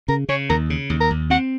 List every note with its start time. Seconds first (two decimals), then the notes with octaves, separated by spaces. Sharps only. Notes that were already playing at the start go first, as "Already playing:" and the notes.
0.08 C#3 A#4
0.29 C#3 C#5
0.50 D#2 A#4
0.70 C#3
0.90 D#2
1.01 A#4
1.11 D#2
1.30 C4 F#5